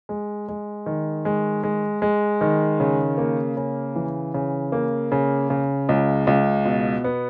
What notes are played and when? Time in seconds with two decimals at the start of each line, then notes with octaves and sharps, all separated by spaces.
0.09 G#3
0.48 G#3
0.86 D#3
1.25 G#3
1.63 G#3
2.02 G#3
2.41 D#3
2.80 C#3
3.18 A#3
3.57 C#3
3.96 E3
4.34 C#3
4.72 A#3
5.12 C#3
5.50 C#3
5.89 C#2
6.27 C#2
6.65 B2
7.04 B3